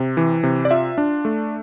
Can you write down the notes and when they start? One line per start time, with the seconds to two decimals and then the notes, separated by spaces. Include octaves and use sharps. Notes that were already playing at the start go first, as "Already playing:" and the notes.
Already playing: C3
0.17 E3
0.43 C3
0.65 D5
0.71 F4 E5
0.98 D4
1.25 A3